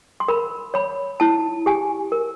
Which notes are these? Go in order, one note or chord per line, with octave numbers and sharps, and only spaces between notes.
C6
A#4 B5
C#5 B5
E4 A5
G4 G#5
A#4